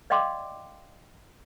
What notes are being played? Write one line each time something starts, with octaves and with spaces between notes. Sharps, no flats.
D5 D#5 F5 G5 C6 D6